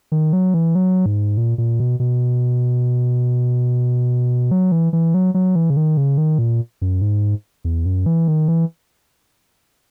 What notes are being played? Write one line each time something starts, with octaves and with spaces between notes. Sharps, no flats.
D#3
F#3
E3
F#3
G#2
A#2
A#2
B2
B2
F#3
E3
E3
F#3
F#3
E3
C#3
D#3
C#3
D#3
A#2
F#2
G#2
E2
F#2
E3
D#3
E3